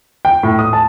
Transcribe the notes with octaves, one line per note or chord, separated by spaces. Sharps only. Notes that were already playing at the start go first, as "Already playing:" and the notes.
G5
A2
D#6
A5